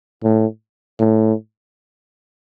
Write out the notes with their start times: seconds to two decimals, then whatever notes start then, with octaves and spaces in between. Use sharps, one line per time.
0.24 A2
0.99 A2